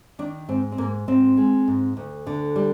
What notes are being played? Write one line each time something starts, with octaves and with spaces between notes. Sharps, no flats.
D#3 D4
G#2 C4
C4
G#2 A#3
G#2 C4
G#3
G#2
D2
D3
G3